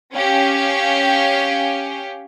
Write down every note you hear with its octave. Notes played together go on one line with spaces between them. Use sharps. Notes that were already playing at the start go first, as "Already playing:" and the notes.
C#4 G4 F5 G5